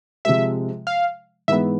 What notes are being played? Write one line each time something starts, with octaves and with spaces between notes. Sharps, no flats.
C3 F3 G#3 E5
F5
G#2 E3 G#3 B3 E5